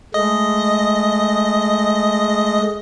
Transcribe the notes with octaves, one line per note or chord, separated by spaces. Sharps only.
G#3 A3 D#5